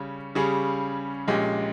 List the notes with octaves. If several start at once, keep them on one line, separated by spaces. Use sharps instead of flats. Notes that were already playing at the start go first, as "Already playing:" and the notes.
Already playing: C#3 G3 C#4
C#3 G3 C#4 G#4
A#1 A#2 G#3 C#4 G4